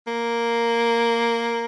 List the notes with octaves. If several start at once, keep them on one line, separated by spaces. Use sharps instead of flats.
A#3